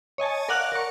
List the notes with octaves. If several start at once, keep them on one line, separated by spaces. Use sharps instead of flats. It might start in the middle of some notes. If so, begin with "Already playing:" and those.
C#5 D#5 G#5 A5
A#4 D5 F5 F#5 F#6
A#4 C#6